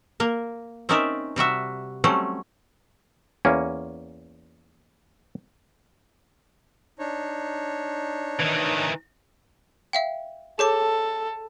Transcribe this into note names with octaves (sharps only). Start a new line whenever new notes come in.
A#3 A#4
C4 C#4 D#4 A#4 D5 E5
C3 G3 F#4 E5
F#3 G3 A3 C4 C#4
E2 A#3 C#4
D4 D#4 C#5
D#3 E3
E5 F5 G5
G#4 A4 C#5 D6